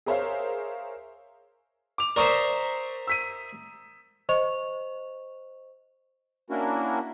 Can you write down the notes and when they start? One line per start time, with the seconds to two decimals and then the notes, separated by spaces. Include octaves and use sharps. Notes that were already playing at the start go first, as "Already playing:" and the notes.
0.06 G#4 A#4 C5 C#5 E5 F5
1.98 D6 F7
2.16 A#4 C5 D5 E5 C#6 D#6
3.07 E6 B6 D#7
4.29 C5 D#5 C#6 F7
6.50 A#3 C#4 D4 E4 F#4 A#4